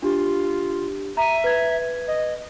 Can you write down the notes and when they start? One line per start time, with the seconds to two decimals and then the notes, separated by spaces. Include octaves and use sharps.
0.02 D4 F4 G4
1.17 E5 A#5 D#7
1.44 B4 G#6
2.08 D#5